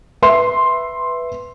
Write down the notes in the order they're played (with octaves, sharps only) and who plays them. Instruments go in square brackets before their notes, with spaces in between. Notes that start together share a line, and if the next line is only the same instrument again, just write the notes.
[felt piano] B4 E5 C6